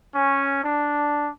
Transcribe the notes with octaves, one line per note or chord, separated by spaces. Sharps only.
C#4
D4